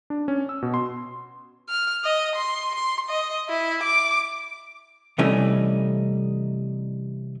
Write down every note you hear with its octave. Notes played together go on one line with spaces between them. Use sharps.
D4
C#4
E6
B2
C6
F6
D#5
C6
C6
D#5
E4
D6
C3 E3 G3 A3 C#4 D#4